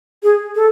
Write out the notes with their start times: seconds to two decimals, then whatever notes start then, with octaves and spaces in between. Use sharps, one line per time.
0.23 G#4
0.55 A4